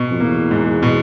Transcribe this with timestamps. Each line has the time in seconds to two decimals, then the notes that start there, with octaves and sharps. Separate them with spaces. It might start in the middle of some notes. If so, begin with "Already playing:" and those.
Already playing: B2
0.11 F2
0.20 E2 A#3
0.51 G#2
0.82 B2